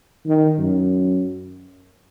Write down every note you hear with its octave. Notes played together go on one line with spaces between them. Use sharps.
D#3
F#2